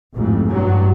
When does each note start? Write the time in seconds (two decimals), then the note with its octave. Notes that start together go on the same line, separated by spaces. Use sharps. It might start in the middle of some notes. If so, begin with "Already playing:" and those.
0.14 A1 F2 G#2
0.50 G2 F#3